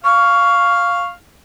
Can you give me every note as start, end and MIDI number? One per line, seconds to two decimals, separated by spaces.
0.04 1.14 77
0.04 1.06 85
0.04 1.14 89